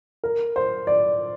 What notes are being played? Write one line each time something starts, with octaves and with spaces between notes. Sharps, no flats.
A#4
C5
D5